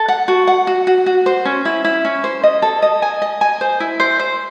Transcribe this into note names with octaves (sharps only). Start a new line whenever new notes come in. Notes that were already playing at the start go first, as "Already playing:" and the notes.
Already playing: A4
F#5
F#4
F#5
F#4
F#4
F#4
C5
C#4
E4
E4
C#4
C5
D#5
A4
D#5
G#5
D#5
G#5
C5
E4
C5
C5